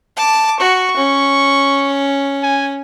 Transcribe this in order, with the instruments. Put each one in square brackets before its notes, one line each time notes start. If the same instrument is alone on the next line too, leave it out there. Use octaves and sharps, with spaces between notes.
[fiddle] A5 D6
[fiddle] F#4 [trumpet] C#6
[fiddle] C#4
[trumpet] G#5